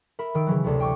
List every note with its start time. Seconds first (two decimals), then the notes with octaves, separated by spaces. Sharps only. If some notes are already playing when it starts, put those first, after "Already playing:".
0.19 A#4 E5 B5
0.35 D#3 E6 D7
0.47 C#3 E3 F#3
0.64 A1 D2 C3
0.80 G5 C#6 D6